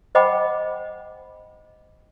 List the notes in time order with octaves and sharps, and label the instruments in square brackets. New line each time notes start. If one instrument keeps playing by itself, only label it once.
[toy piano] C5 D#5 F#5 G5 B5 D6